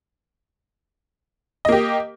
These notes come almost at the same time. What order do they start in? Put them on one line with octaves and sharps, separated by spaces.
D#5 A#3 G4